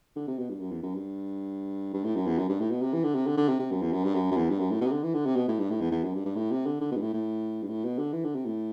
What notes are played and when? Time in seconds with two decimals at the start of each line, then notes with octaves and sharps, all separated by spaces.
0.16 D3
0.27 C3
0.39 B2
0.49 G2
0.60 F#2
0.71 E2
0.82 F#2
0.94 G2
1.93 G2
2.04 A2
2.15 F#2
2.27 E2
2.38 F#2
2.49 G2
2.60 A2
2.71 B2
2.82 C3
2.93 E3
3.03 D3
3.15 C3
3.26 D3
3.37 D3
3.48 C3
3.59 C3
3.71 F#2
3.81 E2
3.92 F#2
4.04 G2
4.15 F#2
4.31 F#2
4.36 E2
4.49 G2
4.59 F#2
4.71 A2
4.81 B2
4.86 C3
4.92 D3
5.03 E3
5.14 D3
5.26 C3
5.36 B2
5.48 A2
5.59 G2
5.70 A2
5.81 E2
5.91 E2
6.03 F#2
6.14 G2
6.25 G2
6.35 A2
6.51 C3
6.66 D3
6.81 D3
6.92 B2
6.96 G2
7.02 A2
7.13 A2
7.62 G2
7.69 A2
7.84 B2
7.98 D3
8.13 E3
8.24 D3
8.35 C3
8.46 A2